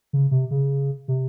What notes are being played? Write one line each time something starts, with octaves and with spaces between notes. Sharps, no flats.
C#3
C3
C#3
C3